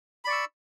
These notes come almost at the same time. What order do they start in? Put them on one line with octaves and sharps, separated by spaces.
B5 D5 C#6 E6